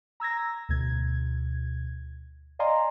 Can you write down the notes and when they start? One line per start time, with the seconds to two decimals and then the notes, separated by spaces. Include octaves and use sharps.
0.20 A#5 E6 G#6 A#6
0.69 D2 B2 G#6
2.59 D5 D#5 F5 G#5 A#5 C6